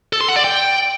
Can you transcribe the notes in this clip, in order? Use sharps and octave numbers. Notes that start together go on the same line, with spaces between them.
A4
C6
F#5
D5
G5